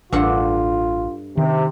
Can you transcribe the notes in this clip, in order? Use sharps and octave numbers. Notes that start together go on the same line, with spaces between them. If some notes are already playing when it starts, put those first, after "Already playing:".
A1 G2 F4 A4 F#5
C3 D#3